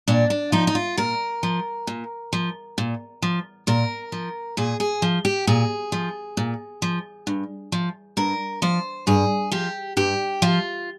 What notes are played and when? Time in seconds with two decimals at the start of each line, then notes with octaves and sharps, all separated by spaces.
0.08 A#2 D4
0.30 D4
0.52 F3 D#4
0.67 D#4
0.75 F4
0.97 A#2 A#4
1.43 F3
1.87 A#2
2.33 F3
2.78 A#2
3.22 F3
3.67 A#2 A#4
4.12 F3
4.57 A#2 G#4
4.80 G#4
5.02 F3
5.25 G4
5.47 A#2 G#4
5.92 F3
6.37 A#2
6.82 F3
7.27 G2
7.72 F3
8.17 G2 A#4
8.62 F3 C5
9.07 G2 G#4
9.52 F3 G4
9.97 G2 G4
10.42 F3 F4